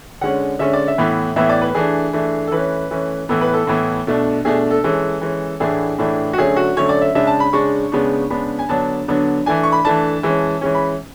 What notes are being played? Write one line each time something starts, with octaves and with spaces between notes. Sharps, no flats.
D3 G#3 C#4 F#5
D3 G#3 C#4 E5
D5
E5
A2 E3 B3
A2 E3 B3 E5
D5
B4
E3 A3 D4 G#4
E3 A3 D4
A4
E3 A3 C#4 B4
E3 A3 C#4
A2 E3 B3 A4
B4
A4
A2 E3 B3
B2 A3 D4
B2 A3 D4 G#4
A4
E3 G#3 C#4 A4
E3 G#3 C#4
A2 E3 A3 D4 G#4
A2 E3 A3 D4
F#4
D3 F#3 A3 C#4 G#4
F#4
D3 F#3 A3 C#4 C#5
D5
E5
C#3 G#3 D4 E5
A5
B5
C#3 G#3 D4 C#6
C#3 G#3 B3 D4
C#3 G#3 B3 D4 B5
G#5
D3 F#3 B3 D4 A5
D3 F#3 B3 D4
E3 A3 D4 G#5
C#6
B5
E3 A3 D4 A5
E3 G#3 C#4
E3 G#3 C#4
B5